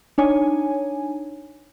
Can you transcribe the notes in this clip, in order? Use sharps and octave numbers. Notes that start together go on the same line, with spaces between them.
D4 D#4 C#5 G#5